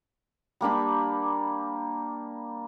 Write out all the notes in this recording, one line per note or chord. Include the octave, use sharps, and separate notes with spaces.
G3 A#3 D4 B5